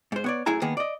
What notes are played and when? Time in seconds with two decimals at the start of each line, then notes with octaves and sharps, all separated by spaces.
0.12 G#2 C5
0.24 B3 C#5 D5
0.46 F#2 A2 E4 G#4 G#5 A#5
0.62 D#3 A#3 B3 G#4
0.77 D5 D#5